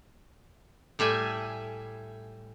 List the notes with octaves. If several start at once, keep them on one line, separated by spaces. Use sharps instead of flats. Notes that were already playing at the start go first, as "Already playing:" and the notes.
A2 G3 E5 G#5